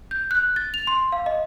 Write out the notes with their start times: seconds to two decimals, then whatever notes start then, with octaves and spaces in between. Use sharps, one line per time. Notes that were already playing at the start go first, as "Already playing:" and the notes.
0.11 G6
0.31 F#6
0.56 A6
0.74 F7
0.87 C6
1.12 F5
1.26 D#5